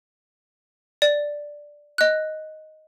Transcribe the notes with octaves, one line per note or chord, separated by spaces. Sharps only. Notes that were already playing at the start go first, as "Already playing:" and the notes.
D5
D#5 F#6